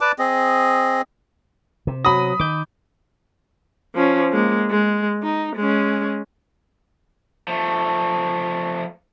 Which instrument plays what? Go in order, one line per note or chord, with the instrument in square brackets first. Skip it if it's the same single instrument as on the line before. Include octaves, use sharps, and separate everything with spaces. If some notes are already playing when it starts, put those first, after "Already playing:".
[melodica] B4 D5 A5 D6
C4 G#4 D#5
[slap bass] C3
[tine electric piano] F#3 A#6 [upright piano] B5 D#6
[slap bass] D#3 [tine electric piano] D6 G6
[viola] F3 C#4
G#3 A#3
G#3
D#4
G#3 C#4
[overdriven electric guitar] F3 A3